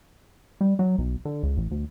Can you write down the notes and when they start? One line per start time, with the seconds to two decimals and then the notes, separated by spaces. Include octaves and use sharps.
0.61 G3
0.79 F#3
0.98 B1
1.25 D3
1.43 C#2
1.57 A1
1.71 D2